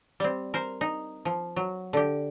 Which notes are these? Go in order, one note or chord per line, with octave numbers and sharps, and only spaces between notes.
G3 C4
A#4 C5
D#4
F3
F#3
D3 G4